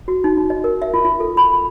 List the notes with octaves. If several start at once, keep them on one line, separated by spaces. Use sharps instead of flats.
F#4
D#4
D#4
D#5
A#4
E5
F4
F4
A4
B5